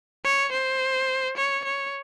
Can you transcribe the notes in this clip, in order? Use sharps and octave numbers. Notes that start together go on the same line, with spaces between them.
C#5
C5
C#5
C#5